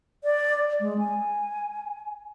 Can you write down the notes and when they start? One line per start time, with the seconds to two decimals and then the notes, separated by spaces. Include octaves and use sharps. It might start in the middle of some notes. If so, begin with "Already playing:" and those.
0.24 D5
0.80 G#3
0.99 G#5